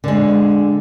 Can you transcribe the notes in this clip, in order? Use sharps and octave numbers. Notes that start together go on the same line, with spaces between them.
D3 G#3